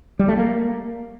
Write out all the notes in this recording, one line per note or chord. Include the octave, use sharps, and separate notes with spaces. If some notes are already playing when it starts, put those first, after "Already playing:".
G3
A3
A#3